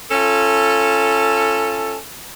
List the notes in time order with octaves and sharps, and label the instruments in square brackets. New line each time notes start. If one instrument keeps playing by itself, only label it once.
[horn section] C#4 F4 A4